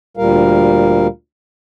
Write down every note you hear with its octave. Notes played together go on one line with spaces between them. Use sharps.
D2 A#2 G3 A#4 F5